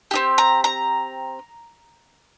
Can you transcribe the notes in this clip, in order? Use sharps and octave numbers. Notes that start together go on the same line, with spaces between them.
C4 D#4 G4
A#5
A#5